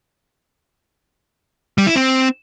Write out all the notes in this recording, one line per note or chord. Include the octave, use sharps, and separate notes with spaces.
G3
E4
C4